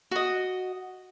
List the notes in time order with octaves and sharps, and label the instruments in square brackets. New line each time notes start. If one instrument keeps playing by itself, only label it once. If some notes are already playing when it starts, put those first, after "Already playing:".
[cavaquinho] F#4 D#5